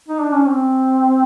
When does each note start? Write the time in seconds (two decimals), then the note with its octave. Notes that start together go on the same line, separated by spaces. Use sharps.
0.09 D#4
0.22 D4
0.34 C#4
0.46 C4